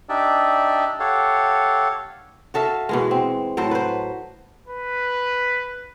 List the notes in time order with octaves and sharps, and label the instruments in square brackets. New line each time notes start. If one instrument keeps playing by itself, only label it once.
[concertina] D4 D#4 G4 D5 E5
G4 A4 C#5 F5 F#5
[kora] F#4 A4 E5 F5
B2 E3 G#3
C4
A2 F#3 A4 C5
B4 C5
[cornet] B4